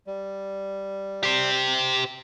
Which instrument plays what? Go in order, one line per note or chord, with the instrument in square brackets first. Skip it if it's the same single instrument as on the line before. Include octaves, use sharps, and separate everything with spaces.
[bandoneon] G3
[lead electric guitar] G4 C5